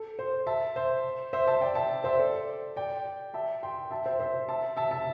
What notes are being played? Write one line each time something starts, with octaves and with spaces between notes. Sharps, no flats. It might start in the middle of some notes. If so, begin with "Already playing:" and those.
Already playing: A4
C5
E5 A5
C5 E5
C5 E5
E5 A5
D5 G5
E5 A5
C5 E5
A4 D5
D5 G5
E5 A5
G5 C6
E5 A5
C5 E5
C5 E5
E5 A5
E5 A5
E5 A5